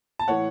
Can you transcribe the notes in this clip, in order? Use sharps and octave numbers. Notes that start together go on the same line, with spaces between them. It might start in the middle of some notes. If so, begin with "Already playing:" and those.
A5
A2 E3 C#5 F#5